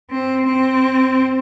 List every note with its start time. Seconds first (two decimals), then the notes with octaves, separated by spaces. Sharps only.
0.11 C4
0.47 C4